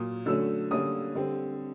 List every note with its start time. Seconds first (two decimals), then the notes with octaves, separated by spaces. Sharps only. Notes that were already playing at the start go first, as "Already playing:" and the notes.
Already playing: A#2 F#3 A#3 D#6
0.26 D3 F#3 A3 C#4 E6
0.71 D3 G3 A#3 C#4 D#6
1.15 D3 G3 C4